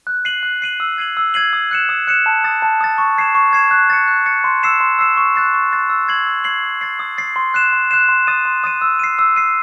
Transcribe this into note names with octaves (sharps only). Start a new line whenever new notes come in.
F#6
C7 D#7 F#7
F#6
C7 D#7 F#7
E6
G#6 C7 D#7 F#7
E6
G#6 C7 D#7 F#7
D#6
F#6 C#7 E7
D#6
F#6 C#7 E7
A5
D#6 A6
A5
D#6 A6
C#6
G#6 C7 E7
C#6
G#6 C7 E7
F#6
A6 C#7
F#6
A6 C#7
C6
E6 C7 E7
C6
E6 C7 E7
C#6
F#6 A6 C7
C#6
F#6 A6 C7
E6
G#6 C7 F#7
E6
G#6 C7 F#7
D#6
A6 C7
D#6
A6 C7
C6
F#6 C7 E7
C6
F#6 C7 E7
C6
D#6 A6 D#7
C6
D#6 A6 D#7
E6
C7 D#7
E6
C7 D#7